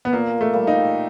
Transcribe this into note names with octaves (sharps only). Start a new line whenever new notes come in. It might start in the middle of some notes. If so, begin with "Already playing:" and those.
B3
A#2 A#3
A3
G3 A#3
D#4